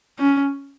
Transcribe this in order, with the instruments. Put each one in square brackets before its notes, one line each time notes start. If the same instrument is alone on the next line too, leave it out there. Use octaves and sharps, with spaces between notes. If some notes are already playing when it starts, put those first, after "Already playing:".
[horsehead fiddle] C#4